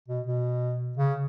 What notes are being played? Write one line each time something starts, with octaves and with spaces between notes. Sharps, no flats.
B2
B2
C#3